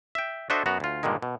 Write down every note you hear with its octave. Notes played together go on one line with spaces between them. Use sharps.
E5 G5
D4 F#4 A4 C5 D#5 E5
F#2 B3 F#4 A#5
D2 F4
G2 A#2 D3 D#3 G#3
B2